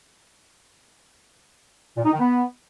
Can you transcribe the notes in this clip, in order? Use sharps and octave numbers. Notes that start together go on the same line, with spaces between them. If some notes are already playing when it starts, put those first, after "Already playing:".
A#2
D#4
D#3
B3